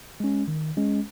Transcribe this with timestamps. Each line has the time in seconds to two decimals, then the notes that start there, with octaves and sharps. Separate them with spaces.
0.20 G#3 C#4
0.48 D#3
0.77 G#3 C#4